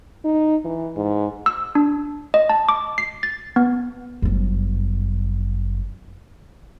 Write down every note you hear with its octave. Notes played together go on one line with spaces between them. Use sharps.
D#4
E3
G#2
E6
D4
D#5
A5
D6
C7
A6
B3
G1 F#2